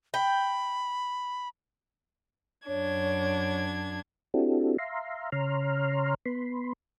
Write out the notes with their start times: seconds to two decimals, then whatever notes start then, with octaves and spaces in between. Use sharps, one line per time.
0.14 G5 B5
2.67 F#2 D4 C#5 G#6
4.34 C4 D4 E4 F#4 G4 A4
4.79 E5 F5 A#5 C6
5.32 C#3 C#5 A#5 C6 F6
6.26 B3 B5 C6